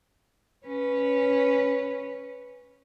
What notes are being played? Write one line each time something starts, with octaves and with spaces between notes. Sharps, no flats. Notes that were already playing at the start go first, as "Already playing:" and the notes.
C#4 B4 C#5